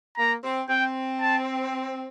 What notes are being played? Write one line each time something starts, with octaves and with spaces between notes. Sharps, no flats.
A#3 A#5
C4
C4 G5
A5